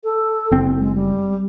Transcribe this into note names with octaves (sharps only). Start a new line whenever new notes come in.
A4
F#1 C4
G#3
G3